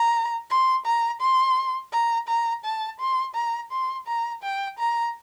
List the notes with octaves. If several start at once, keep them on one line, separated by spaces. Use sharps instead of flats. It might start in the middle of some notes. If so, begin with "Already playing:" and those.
Already playing: A#5
C6
A#5
C6
A#5
A#5
A5
C6
A#5
C6
A#5
G5
A#5